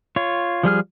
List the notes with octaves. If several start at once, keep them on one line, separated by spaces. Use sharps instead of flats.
F4 C#5
F3 G3 G#4 F6